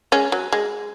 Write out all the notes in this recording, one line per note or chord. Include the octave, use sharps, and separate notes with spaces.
G#3 C#4
F#3
G#3